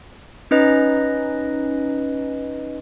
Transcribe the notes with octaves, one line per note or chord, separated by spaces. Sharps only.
C#4 D#4 B4 D#5